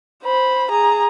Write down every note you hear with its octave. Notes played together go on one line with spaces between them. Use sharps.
C5 B5
G#4 A#5